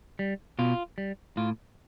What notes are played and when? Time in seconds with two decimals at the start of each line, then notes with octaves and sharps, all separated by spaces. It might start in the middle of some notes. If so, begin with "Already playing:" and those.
0.19 G3
0.59 B2 F4
0.98 G3
1.37 A2 F4